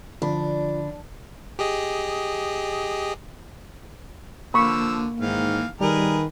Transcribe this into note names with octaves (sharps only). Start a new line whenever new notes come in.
D3 F3 D4 B5
G4 G#4 D#5
D3 F3 A#3 B5 C#6 E6
G#2 D#3 E3 F5
D#3 G3 G#4 A#4 B4